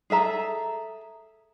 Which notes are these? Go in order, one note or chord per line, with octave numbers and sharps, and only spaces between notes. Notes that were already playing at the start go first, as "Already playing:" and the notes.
G#4 A4 E5 A#5